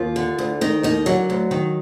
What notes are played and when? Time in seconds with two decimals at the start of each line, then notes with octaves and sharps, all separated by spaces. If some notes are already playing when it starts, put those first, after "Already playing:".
Already playing: D#2 F4
0.16 D3
0.38 D2
0.61 D#3 D#4
0.83 D#2 D#4
1.06 D3 F#3
1.30 D2
1.51 D#3